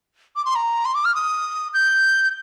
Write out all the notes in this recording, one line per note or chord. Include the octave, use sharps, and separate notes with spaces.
D6
C6
A#5
C6
D6
F6
D#6
G6